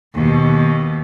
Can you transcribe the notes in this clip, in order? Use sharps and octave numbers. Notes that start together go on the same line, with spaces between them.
D#2 B2